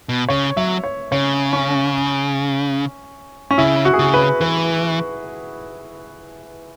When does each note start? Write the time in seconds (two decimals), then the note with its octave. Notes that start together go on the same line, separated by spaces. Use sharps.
0.09 B2
0.29 C#3 C#5
0.57 F#3 E5
0.84 C#5
1.12 C#3 C#5
1.53 C#4
3.51 C#4
3.58 C#3 E4
3.85 F#4
3.93 G#4
3.99 C#3 F#4
4.14 B4
4.41 E3 B4